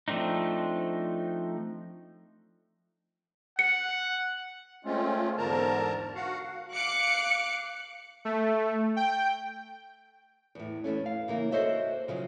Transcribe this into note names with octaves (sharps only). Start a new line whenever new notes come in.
F3 A3 C4 D4 D#4
F#5 C#7
G#3 A3 C4 C#4 F4
E2 G#2 D3 A#4 A5 A#5
F#4 F5 F#5
F5 D6 F#6 C#7
A3
G5
E2 A2
E2 G#2 A3 C#4
F5
C#3 E3 A#3
F#4 A4 C5 C#5 D#5 E5
C#3 F3 F#3